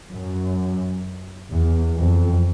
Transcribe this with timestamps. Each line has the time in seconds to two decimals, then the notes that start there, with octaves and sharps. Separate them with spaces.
0.12 F#2
1.52 E2
1.98 F2